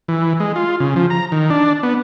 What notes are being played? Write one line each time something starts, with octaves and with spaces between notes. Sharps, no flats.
E3
G#3
F4
C#3
F3
A#5
D#3
D4
B3